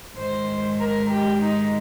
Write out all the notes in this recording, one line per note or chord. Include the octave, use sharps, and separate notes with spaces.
G#2 D#3 G#3 C5
A#4
G4
D#4